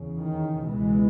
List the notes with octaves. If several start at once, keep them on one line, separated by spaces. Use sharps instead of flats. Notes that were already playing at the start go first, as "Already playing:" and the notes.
Already playing: E2 C#3
D#3
C#2 B2 E3 G#3